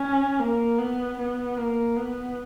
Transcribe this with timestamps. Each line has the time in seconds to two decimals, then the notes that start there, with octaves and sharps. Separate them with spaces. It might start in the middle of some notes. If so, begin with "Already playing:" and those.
Already playing: C#4
0.40 A#3
0.79 B3
1.19 B3
1.57 A#3
1.97 B3